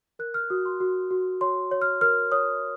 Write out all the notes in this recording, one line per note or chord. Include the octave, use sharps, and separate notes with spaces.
A#4 F#6
F6
F#4 D#6
C6
F#4
F#4
C#5 C6
C#5
F6
A#4 F6
C#5 D#6